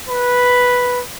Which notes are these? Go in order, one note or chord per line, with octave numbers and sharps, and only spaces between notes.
B4